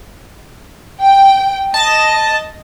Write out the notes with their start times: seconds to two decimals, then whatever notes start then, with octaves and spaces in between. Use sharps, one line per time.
1.00 G5
1.74 D#5 A5 A#6